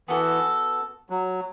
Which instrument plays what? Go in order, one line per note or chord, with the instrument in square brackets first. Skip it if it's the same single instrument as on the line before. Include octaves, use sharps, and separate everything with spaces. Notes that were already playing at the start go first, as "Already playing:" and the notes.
[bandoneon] E3 [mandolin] B3 F#4 A4
[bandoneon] F#3